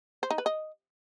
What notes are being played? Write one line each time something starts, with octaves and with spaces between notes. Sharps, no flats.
C5
D#4
B4
D#5